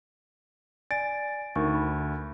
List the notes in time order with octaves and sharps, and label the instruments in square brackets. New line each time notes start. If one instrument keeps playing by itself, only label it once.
[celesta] D5 G#5 D7 [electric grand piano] A6
[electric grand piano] D2 [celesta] D#4 A#4 C#6
[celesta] B5